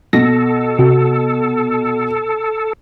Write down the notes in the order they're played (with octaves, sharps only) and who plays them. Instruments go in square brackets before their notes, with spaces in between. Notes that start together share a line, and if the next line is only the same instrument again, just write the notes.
[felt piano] B2 [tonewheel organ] A4 [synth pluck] A#6
[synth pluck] C3 F#4